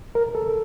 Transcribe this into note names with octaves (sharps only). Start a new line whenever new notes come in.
A#4
A4